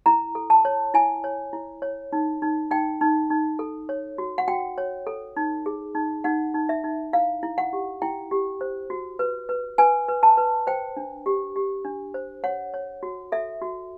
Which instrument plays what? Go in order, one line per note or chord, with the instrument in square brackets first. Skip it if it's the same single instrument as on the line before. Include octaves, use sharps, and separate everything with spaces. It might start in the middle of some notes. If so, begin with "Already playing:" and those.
[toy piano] E4 A#5
A4
A5
C#5
E4 G#5
C#5
E4
C#5
D#4
D#4
D#4 G5
D#4
D#4
A4
C#5
F#4
F#5
F#4 G5
C#5
A4
D#4
G#4
D#4
D#4 F#5
D#4
E5
D#4
E4 F5
E4
F#5
G4
E4 G5
G4
C5
F#4
B4
B4
B4 G#5
B4
A5
B4
C5 G5
D4
G4
G4
D4
C5
C#5 F#5
C#5
F#4
A4 E5
F#4